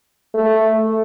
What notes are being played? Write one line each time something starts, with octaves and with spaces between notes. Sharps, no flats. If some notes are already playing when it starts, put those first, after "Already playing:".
A3